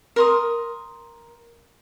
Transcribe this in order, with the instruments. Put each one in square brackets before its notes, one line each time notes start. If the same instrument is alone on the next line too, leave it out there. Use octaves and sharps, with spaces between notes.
[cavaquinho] A#4 C6 D#6